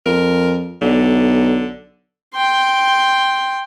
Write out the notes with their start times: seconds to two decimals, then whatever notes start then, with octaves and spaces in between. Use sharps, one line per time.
0.06 F2 A#4
0.82 B1 D3
2.34 G5 C6